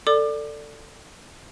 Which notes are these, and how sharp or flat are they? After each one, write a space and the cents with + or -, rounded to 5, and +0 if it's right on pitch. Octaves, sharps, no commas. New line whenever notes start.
A4 +20 D5 +0 D6 +30